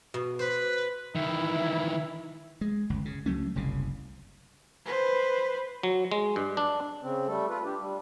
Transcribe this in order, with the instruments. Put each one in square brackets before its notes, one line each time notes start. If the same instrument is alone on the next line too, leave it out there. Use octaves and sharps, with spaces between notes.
[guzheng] B2
[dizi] B4 [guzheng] C5
[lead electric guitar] D#3 E3 [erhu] E4
[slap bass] G#3
G1 C#2
C#3
C#2 F#3 A3 C#4
F#1 C2 C#3
[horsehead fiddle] B4 C5
[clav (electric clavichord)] F#3
G#3
G2
D4
[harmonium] C#3 C4
G3 A3 A4
F4 B4
D4 G4
G3